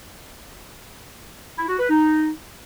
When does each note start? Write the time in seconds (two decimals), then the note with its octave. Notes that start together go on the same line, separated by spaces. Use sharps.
1.57 E4
1.68 F#4
1.79 B4
1.90 D#4